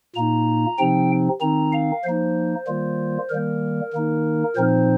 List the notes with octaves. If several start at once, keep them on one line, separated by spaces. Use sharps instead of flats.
A#2 A#3 D#4 A#5
C3 F3 C4 D#4 G5
D#3 C4 D#4 A#5
F5
F3 A#3 D#4 C5
D#3 G3 A#3 F4
D#3 G3 A#3 A#4
D#3 A#3 D#4
A#2 F3 C4 D#4 C5